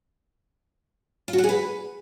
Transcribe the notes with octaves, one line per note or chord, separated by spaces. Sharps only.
F4
F#4
F#5
G#4
B4